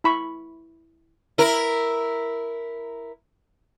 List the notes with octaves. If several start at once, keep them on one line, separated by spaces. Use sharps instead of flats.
E4 B5 C#6
E4 A#4